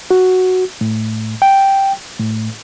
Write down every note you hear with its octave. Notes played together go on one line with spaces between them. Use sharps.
F#4
A2
G5
A2